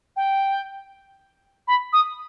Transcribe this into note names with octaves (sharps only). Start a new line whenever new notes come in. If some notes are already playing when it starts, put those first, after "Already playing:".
G5
B5
D#6